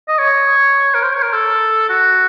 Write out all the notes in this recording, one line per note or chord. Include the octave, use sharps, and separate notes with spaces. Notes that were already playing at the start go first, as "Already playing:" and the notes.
D#5
C#5
A#4
C5
C#5
A#4
A4
F#4